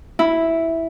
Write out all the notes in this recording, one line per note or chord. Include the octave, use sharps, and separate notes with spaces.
E4